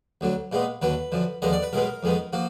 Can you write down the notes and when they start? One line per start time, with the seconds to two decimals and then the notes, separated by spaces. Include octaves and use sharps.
0.21 D2 D3 F#3
0.52 A#2 G#3 B3
0.82 D#2 D3 F#3 B4
1.12 F#2 D3 F3
1.42 D#2 D3 F3 G#3 B3 D#5
1.52 D5
1.63 B4
1.73 B1 B2 G#3 B3 A#4
2.03 F2 D#3 G#3 B3
2.33 F3 A#3 F#4